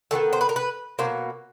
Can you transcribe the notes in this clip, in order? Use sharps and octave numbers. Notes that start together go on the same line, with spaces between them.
D#3 G#3 B3 A4
C5
B4
A#4
B4
B2 F#3 A#3 C5